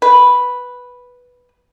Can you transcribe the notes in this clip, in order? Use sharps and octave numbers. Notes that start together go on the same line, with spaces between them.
B4